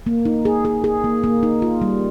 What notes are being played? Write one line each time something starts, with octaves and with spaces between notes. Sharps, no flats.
A#3
D#4
G#4
G#4
G#4
A#3
A#3
D#4
F4
G3